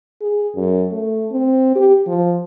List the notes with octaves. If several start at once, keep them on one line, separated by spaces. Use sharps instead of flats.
G#4
F#2
A3
C4
G4
F3